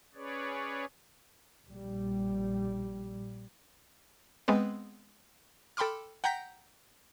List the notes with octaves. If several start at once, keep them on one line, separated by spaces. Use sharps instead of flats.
C#4 G#4 B4 C#5 D5
A#1 G3
G#3 B3 C4 B4
A4 G5 B5 C6 D6 F6
F#5 G5 A#5 G6 A#6 B6